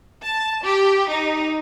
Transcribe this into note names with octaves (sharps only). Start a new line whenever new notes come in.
A5
G4
D#4